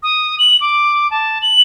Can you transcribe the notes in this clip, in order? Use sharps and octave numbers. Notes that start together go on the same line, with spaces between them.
D#6
F#7
D6
A5
F#7